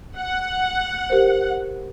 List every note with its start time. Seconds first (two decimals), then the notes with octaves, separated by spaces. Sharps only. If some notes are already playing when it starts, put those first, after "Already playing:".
0.17 F#5
1.10 G4 A#4 C5